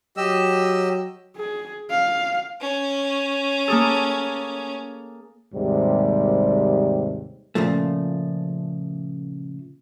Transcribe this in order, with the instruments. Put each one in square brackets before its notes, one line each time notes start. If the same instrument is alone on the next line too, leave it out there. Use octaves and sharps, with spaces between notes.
[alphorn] F#3 [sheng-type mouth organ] G4 D#5 E6
[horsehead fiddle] G#4
F5
[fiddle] C#4
[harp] A#3 G#4 A4
[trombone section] D#2 G#2 C3 G3
[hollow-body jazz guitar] A#2 C#3 F3 A3